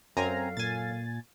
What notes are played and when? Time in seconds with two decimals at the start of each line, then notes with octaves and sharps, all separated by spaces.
0.17 F#2 F#3 C4 A4 F5 G#5 A#5
0.57 A#2 G#5 A6